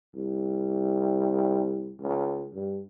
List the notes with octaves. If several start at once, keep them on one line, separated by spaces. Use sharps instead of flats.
C2
C#2
G2